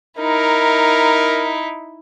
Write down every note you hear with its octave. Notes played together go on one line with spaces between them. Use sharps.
D#4 E4 A#4